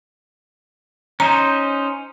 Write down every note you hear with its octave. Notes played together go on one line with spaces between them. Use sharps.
C#4 D#4 C5 A#5